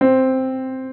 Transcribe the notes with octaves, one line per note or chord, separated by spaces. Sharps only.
C4